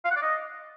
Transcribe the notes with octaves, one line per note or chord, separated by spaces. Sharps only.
F5
F#5
D5
D#5